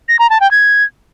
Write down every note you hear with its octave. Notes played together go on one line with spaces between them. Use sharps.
A#6
A#5
A5
G5
G#6